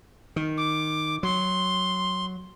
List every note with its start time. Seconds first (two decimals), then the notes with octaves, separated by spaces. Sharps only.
0.36 D#3
0.57 D6
1.23 F#3 C6